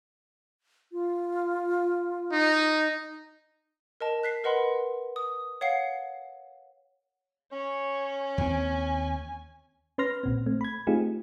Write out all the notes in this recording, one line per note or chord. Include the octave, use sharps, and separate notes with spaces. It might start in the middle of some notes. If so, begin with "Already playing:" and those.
F4
D#4
A#4 D#5 A5
F#6 B6 C7
A#4 B4 D#5 F#5 B5 C6
D#6
C#5 F5 F#5 C7
C#4 C#5
D#2 C4 G#5
C#4 B4 C6 F6 A#6
B1 A#2 C4
A3 C4
B5 G#6
A3 C4 D#4 F4 G4 G#4